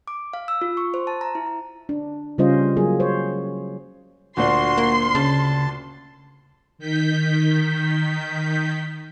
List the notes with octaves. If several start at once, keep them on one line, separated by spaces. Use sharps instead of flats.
D6
F5
E6
F4
C#6
C5
A5
A#5
E4
A#5
D4
C#3 G3 C#4 F4 C5 D#5
F#3 A#3 G#4
C5 C#5
D2 A#2 D4 F#4 C6
A#3
C#3 A5
D#3 G6 B6